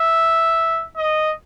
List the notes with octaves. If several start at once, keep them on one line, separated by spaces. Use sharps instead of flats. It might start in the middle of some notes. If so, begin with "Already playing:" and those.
Already playing: E5
D#5